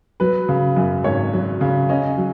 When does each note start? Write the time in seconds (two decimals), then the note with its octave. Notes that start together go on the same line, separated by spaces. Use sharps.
0.20 F#3 B4
0.49 C#3
0.77 F#2
1.04 G#1 C#5
1.33 F#3
1.61 C#3
1.89 C#4 D#5
2.18 F#3